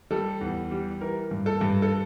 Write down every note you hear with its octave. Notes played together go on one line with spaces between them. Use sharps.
G3 A4
E2
G3
E3 A#4
G2
A4
G2
A4